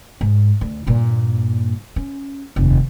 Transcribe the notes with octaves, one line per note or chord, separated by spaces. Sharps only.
G#2
D2
G2 A#2
C#4
F1 D#2